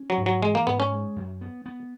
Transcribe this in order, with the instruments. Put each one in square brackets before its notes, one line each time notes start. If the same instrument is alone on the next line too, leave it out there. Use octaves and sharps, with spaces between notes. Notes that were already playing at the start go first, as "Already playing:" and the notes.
Already playing: [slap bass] C#4
[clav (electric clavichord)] F#3
[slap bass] G#2
[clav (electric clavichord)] F#3
[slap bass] E3 [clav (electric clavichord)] G#3
[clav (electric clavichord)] A#3
[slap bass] G#2 [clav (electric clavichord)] B3
[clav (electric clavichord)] C#4
[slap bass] G#3
F#2
B3
B3